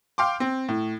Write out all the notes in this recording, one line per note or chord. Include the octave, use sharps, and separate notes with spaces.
F5 G5 C6 D6
C4
A2